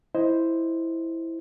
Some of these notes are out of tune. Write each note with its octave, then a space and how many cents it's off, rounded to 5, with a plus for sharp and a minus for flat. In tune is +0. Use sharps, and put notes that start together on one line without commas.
E4 +0 C5 +0 D#5 +0